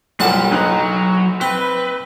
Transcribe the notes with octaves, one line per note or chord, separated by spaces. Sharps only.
F#1 B1 F3 G3 A#4 F#5 A5
F#1 F#3 D#4 A#5 F#6
C4 B4